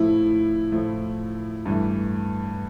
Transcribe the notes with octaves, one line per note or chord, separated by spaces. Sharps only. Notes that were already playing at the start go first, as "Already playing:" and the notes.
Already playing: A2 F3 A3 E4
A2 F3 A3
G2 E3 A3